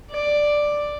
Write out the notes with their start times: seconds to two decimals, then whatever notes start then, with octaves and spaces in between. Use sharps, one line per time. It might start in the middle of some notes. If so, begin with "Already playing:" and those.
0.10 D5